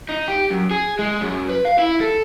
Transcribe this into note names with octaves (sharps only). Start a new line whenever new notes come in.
D#4
G4
F#2
G#4
G#3
F#2
B4
F5
E4
A4